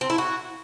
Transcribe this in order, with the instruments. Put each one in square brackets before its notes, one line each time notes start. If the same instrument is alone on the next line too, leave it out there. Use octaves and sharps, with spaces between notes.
[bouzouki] C4
E4
F#4